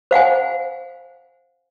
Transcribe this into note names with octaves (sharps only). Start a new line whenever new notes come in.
C5 F5 F#5 G#5